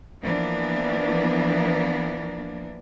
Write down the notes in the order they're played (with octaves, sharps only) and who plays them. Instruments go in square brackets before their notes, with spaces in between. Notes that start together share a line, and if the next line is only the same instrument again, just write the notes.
[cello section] E3 F3 A#3 B3 D4